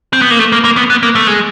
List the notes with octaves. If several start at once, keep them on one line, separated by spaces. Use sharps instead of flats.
C4
B3
A#3
A3
A#3
A#3
B3
B3
A#3
A3
G#3